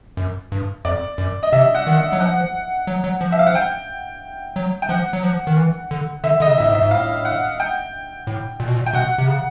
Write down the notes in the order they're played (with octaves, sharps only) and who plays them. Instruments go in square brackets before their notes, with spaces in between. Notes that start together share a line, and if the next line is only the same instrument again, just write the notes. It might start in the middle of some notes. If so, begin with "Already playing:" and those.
[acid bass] F#2
G2
[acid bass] F2 [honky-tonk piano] D5
[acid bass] F#2
[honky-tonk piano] D#5
[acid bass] C3 [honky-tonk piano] E5
[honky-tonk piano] F#5
[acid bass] D#3
[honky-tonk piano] F#5
[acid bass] F#3
[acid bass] F3 [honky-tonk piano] F#5
[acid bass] F#3
F#3
F3
[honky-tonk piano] E5
F5
F#5
G5
[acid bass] F#3
[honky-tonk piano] G5
[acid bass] F3 [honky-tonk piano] F#5
[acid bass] F#3
F3
D#3
E3
D3
[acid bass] D3 [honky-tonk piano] E5
[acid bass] D3 [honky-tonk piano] D#5
[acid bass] C#3
[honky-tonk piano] D#5
[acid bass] A2 [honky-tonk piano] E5
[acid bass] G#2
[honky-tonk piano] E5
[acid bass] G#2
[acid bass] A2 [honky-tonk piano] F5
[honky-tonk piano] F#5
G5
[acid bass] A2
A#2
B2
A#2
[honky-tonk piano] G5
[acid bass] B2 [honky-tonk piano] F#5
[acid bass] C3
C#3